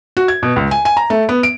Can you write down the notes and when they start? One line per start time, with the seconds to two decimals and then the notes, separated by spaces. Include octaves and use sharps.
0.17 F#4
0.28 G#6
0.43 B2
0.56 C#2
0.71 G#5
0.85 G#5
0.97 A#5
1.10 A3
1.29 B3
1.43 D7